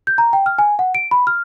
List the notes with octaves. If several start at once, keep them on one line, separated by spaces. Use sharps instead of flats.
G6
A#5
G5
F6
G#5
F#5
D7
B5
F6